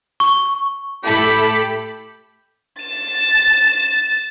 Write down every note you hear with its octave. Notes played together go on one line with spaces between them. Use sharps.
C#6
A2 E4 G4 A4 B5
A6 E7